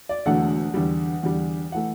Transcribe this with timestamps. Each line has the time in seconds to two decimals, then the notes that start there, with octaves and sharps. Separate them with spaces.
0.09 D5
0.26 E1 E2 D3 F#3 A3 F#5
0.74 E2 D3 G3
1.23 E2 D3 G3
1.72 E3 A3 F#5